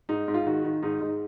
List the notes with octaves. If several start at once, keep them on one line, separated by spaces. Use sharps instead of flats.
G#2 D#4
G#2
F4
D#3 F#4
D#3
G#2 D#4
G#2